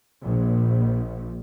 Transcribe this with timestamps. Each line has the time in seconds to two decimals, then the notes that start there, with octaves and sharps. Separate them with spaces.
0.22 A#1